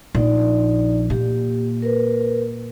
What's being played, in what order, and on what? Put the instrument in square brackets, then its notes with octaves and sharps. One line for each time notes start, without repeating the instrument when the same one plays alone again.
[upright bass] A#1 [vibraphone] D#4 D5
[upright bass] A#2 [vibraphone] G4
[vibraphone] A#4 B4